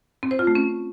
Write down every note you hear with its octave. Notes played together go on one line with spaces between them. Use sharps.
C4
C5
F4
A3
C#4